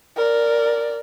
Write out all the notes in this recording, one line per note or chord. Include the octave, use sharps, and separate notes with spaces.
A#4 D5